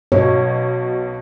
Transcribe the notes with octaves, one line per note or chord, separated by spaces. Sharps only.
B1 B2 C#5